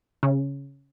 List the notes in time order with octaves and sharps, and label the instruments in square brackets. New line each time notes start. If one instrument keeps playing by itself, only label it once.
[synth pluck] C#3